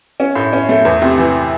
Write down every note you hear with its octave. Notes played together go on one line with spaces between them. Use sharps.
C#4
A2
C#4
A3
E2
C3
E3